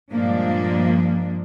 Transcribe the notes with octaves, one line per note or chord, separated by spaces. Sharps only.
G2 A#2 F3 G#3 A#3 D4